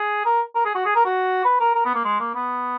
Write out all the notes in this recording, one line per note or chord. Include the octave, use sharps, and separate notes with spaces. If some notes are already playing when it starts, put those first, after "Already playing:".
Already playing: G#4
A#4
A#4
G#4
F#4
G#4
A#4
F#4
B4
A#4
A#4
B3
A#3
G#3
A#3
B3